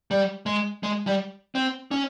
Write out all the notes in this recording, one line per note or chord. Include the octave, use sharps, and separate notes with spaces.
G3
G#3
G#3
G3
C4
C#4